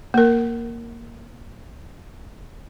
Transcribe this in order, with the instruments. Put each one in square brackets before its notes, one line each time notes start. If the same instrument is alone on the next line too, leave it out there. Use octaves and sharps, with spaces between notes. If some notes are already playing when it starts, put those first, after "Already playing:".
[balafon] A#3 A#4